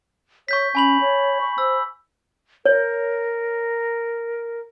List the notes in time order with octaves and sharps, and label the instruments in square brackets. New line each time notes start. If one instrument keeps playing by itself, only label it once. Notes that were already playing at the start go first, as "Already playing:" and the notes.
[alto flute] C#5 [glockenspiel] C#6 G6 B6
[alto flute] C#4 [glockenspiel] G#5 B5 F#7
[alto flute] C#5
C#6
[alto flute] C5 [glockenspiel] E6
[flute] A#4 [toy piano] C#5